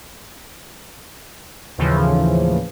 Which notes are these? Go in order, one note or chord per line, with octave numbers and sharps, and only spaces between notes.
D#2 A2 C#3 E3 F3